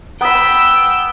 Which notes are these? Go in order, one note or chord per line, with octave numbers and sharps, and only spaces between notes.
B3 G5 B5 E6